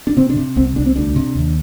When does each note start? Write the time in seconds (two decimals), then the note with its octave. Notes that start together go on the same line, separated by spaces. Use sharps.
0.07 D4
0.17 C3 C4
0.30 D4
0.36 C3
0.56 C2 C4
0.76 C2 D4
0.86 C4
0.96 D2 D4
1.16 C3
1.35 D#2